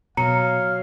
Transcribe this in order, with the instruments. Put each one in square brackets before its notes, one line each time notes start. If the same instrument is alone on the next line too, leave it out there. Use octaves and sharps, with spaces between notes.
[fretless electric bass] B2 [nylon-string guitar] F#3 [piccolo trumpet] F5 [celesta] A#5 C#7